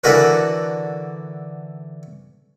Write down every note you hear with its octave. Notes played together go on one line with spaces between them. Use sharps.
D3 E3 D4 F#4 A#4 B4